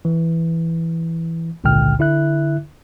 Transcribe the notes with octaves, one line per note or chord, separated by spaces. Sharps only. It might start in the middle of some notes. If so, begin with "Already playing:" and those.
E3
G#1 C#2 A#2 D3 G5 F6
D3 E4 E5 F#6